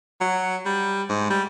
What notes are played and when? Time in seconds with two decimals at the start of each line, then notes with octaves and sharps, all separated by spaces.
0.21 F#3
0.65 G3
1.09 G#2
1.30 G3